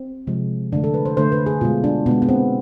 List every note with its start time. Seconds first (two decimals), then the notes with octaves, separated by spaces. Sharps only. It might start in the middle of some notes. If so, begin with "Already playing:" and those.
Already playing: C4
0.27 C3 F3 G#3
0.72 D3 A3 D4
0.84 A4
0.94 B4
1.05 C5
1.17 D3 A3 C5
1.32 B4
1.46 G#4
1.61 B2 G#3 F4
1.84 D4
2.06 B2 G#3 B3
2.22 B3
2.29 C4